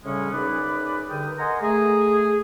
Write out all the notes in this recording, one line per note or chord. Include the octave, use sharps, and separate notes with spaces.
A2 C#3 G3 G#3 C#4
F#2 D#4 G#4 B4 D5 B5
G2 D3 A#4 G5 D#6
A#4 D#5 F#5 G#5 A#5 C6
A3 G#4